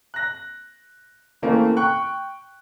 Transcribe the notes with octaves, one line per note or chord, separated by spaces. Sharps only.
F#6 A#6
C#3 E3 A3 A#3 C4
G5 C#6 F#6